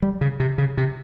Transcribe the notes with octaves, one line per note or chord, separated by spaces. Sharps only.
G3
C#3
C3
C#3
C3